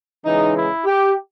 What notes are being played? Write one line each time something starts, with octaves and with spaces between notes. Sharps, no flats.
C#3 E3 G#3 D#4
E4
G4